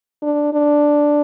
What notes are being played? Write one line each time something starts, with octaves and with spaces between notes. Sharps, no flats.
D4
D4